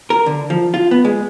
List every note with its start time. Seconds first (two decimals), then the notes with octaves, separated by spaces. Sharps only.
0.10 A#4
0.26 D3
0.50 F3
0.74 F4
0.91 B3
1.05 G#3